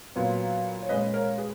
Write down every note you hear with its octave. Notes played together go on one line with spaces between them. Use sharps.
A#2 F#3 B3
C#5
A#2 G#3 C#4 B4 D#5
A#4 C#5
G#4 B4